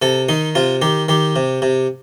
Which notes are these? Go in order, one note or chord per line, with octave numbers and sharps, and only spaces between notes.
C3 A4
D#3 D#4
C3 F4
D#3 G4
D#3 G4
C3
C3